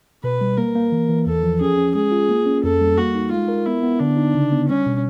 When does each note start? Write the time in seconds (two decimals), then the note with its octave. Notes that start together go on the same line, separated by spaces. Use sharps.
0.24 B2 B4
0.41 G3
0.58 A#3 A#4
0.75 A#3
0.92 E3
1.09 E3
1.26 E2 A4
1.43 F3
1.61 C#4 G#4
1.77 C#4
1.95 G#3 G#4
2.11 F4
2.29 A#3
2.46 C#4
2.64 F2 A4
2.81 G3
2.98 A#3 F#4
3.15 D#4
3.32 G#3 F4
3.48 A#4
3.66 B3 E4
3.83 B3
4.00 D3 D4
4.17 D#4
4.35 C#3
4.52 B3
4.68 G3 C#4
4.86 B2